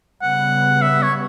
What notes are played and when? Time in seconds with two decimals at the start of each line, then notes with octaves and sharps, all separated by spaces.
0.22 C#3 G3 B3 F#5
0.82 E5
1.03 C#5